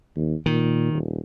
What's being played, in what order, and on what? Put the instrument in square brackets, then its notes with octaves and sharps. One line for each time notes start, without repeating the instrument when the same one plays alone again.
[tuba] D#2
[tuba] A#2 [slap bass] D#3
[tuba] D#1